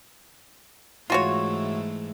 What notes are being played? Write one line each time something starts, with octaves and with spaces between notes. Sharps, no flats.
G#2 E3 A3 F4 F#4 C#5